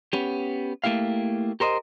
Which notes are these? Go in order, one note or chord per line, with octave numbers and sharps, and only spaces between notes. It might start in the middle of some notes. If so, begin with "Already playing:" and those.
B3 C#4 G4
A3 A#3 E4 G4 F5
G4 A#4 C5 D5 D#5